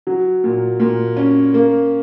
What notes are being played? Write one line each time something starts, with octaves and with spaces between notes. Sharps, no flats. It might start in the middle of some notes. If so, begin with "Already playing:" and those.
F#3
A#2
A#2
C#4
A#3